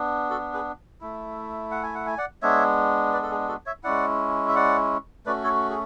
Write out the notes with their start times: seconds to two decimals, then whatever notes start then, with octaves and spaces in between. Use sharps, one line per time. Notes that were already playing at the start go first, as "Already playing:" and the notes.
Already playing: B3 D4
0.30 F#4 A4
0.53 G#4 B4
1.01 A3 E4
1.71 F#5
1.83 G#5
1.95 F#5
2.06 G#5
2.18 D5 F#5
2.42 G#3 B3 D4 C#5 E5
3.13 B4 D5
3.23 A4
3.31 G#4
3.48 F#4 A4
3.66 C#5 E5
3.84 G#3 C#4 E4 D5 F#5
4.48 E5
4.56 D5 F#5
5.26 A3 C#4 F#4 B4 D5
5.43 A4 C#5
5.70 G#4